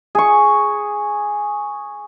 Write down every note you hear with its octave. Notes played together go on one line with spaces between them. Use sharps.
G#4 C#6